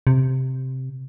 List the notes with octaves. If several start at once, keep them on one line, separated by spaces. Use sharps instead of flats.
C3